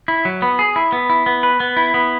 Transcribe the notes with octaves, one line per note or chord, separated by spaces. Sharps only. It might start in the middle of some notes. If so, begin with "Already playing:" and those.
E4
F#3
B3
G#4
E4
B3
E4
B3
B4
B3
E4
B3